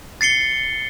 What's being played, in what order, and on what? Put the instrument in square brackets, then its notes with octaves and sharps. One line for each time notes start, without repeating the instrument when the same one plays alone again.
[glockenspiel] A6 C7 C#7 G7